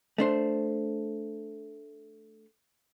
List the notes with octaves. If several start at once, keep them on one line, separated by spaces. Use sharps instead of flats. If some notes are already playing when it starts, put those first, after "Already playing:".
A3 D4 C5